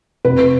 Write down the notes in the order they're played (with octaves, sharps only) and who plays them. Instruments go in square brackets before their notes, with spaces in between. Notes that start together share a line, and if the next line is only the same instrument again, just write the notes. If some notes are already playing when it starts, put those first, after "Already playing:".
[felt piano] F1 B4